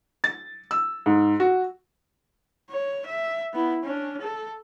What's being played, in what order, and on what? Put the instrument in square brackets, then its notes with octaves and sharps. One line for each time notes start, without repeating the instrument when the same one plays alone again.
[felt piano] A6
E6
G#2
F#4
[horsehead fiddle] C#5
E5
B3 E4
C#4 D4
A4